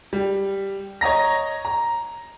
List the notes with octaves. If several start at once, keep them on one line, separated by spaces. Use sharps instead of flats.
G3
C#5 D#5 A#5 A#6
A#5